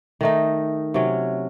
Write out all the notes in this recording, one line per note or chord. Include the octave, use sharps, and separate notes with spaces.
D#3 A3 D#4
C3 F#3 C#4